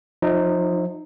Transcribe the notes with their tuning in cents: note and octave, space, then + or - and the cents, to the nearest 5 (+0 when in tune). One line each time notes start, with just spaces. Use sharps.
F3 +20 D#4 -20 E5 -25